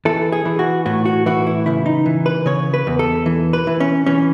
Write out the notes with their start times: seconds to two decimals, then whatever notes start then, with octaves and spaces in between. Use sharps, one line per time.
0.05 E3 A4
0.32 G#4
0.45 E3
0.59 F#4
0.86 A2 F#4
1.05 F#4
1.26 E3 F#4
1.47 E4
1.66 C#3 E4
1.86 D#4
2.06 E3
2.26 B4
2.46 C#3 C#5
2.74 B4
2.87 E2
2.99 A4
3.26 E3
3.53 B4
3.67 E3
3.80 C#4
4.06 E3 C#4